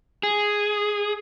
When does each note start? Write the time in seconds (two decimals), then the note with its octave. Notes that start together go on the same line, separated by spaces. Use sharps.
0.23 G#4